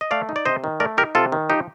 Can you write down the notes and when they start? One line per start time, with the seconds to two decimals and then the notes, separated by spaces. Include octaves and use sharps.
0.01 D#5
0.11 A3 D5 F5
0.29 D#4
0.36 D5
0.45 C3 C5 D#5
0.64 D#3
0.80 A3 A#4 D5
0.97 D#4 G4 A#4
1.15 C3 F4 A4
1.32 D#3
1.50 F3 D#4 G4